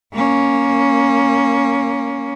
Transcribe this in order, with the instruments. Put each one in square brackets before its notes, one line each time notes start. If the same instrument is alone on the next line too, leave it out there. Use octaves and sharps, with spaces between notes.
[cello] A#3 C#4